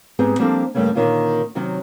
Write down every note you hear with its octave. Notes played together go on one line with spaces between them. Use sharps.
G#2 B3 C4 G4 G#4
F3 G3 A#3 C4 D4 A4
G2 C#3 G3 A3 A#3 C#4
A#2 D3 D#3 A#3 C#4 F4
C3 D#3 F#3 C#4